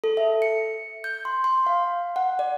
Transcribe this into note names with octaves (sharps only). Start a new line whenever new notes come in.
A4
E5
C#7
G6
C6
C6
F5
F#5
D5